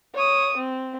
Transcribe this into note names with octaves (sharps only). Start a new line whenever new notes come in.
C#5 D#6
C4